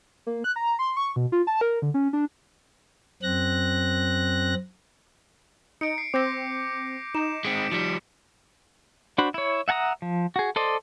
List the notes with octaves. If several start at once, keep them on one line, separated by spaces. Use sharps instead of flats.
A#3
F#6
A#5
C6
C#6
B2
F4
A5
A#4
D3
C#4
D4
F#2 C4 F#6 A#6
D#4 C#7 D7
C7
C4 D6 G6 A#6
D#4 E7
G#3 C4 B6 C#7 D7
F3 G3 B6 C#7 E7
D4 F#4 C5 B5
E4 C#5
E5 F#5 G#5 A#5 D#6
F3
F#4 G#4
A4 C5 D5 D#5 C6